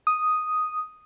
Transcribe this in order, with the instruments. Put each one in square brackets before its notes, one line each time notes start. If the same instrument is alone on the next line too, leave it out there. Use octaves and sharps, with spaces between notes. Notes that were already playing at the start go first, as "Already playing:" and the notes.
[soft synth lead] D#6